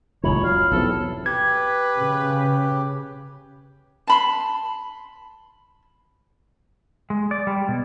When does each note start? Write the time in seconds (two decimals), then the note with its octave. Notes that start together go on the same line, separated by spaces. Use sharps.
0.24 D#1 C#2 D#3 F4 C#5 B5 F#7
0.44 F#3 F5
0.72 B1 E2 C3 A4
1.26 G4 B4 G#6
1.99 C#3
4.07 A5 B5 C6
7.10 G#3
7.31 D5
7.47 G3
7.68 B2